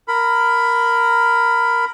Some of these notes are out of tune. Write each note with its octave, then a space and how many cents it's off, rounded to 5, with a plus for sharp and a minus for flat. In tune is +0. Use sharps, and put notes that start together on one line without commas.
A#4 +0 B5 +15